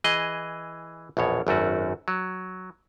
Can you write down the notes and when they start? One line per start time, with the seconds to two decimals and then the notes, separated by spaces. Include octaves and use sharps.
0.04 E3 G#4 D#5
1.17 A#1 E2 B2 C#5
1.47 G#1 F#2 A3 F#4
2.08 F#3